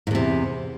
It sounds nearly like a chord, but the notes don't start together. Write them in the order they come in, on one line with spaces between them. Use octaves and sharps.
G#2 E2 C3